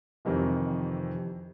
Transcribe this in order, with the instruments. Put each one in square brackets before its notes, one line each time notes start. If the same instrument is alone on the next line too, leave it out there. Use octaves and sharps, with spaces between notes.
[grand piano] F2 C3 D#3 E3